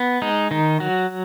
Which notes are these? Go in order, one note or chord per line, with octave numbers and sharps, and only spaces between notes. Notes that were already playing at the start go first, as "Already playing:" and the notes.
Already playing: B3
G#3 D#4
D#3 D#4
F#3 F#4